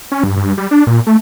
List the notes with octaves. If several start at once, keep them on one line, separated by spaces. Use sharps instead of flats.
C#4
G2
G2
G3
D4
A#2
A3